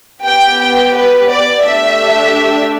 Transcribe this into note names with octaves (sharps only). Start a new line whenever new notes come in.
B3 G4 G5
G5
B4
D5
A3 D4 G4 E5